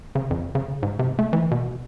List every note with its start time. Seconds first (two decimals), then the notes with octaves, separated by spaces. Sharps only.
0.15 C#3
0.30 F2
0.55 C#3
0.83 G#2
0.99 C3
1.19 A3
1.33 E3
1.51 B2